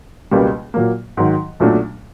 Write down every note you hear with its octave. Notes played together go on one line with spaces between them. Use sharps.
C#2 B2 G3 A#3
A#2 F#3 A#3
G#2 D#3 F#3
B1 A#2 F#3 A3 D4